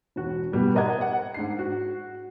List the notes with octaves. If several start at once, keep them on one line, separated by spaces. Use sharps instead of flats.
E1 F#4
B2 G3 B3
C5 D5 D#5 F#5 A#5 G#6
F#5
G#2 D4 C7
F#4